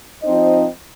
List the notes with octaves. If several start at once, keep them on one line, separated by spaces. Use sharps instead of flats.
F3 C4 D#4 C5 D#5